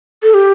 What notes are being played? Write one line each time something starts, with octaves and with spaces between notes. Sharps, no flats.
A4
G4